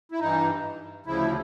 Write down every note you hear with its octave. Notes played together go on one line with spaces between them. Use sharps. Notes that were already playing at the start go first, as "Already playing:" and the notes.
E4
G2 E3 D#4
D2 C#3 F3 E4